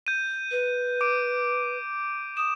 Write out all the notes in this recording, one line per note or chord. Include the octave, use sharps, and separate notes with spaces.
G6 D#7
B4
D6 D7
D#6 E7